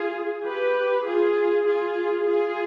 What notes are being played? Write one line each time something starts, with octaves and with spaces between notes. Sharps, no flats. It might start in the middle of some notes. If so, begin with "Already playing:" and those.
Already playing: F4 G#4
G4 B4
F4 G#4
F4 G#4
F4 G#4